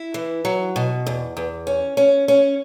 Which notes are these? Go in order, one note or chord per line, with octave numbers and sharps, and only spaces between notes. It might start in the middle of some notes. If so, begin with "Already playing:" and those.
Already playing: E4
E3
F#3
B2
E2
E2
C#4
C#4
C#4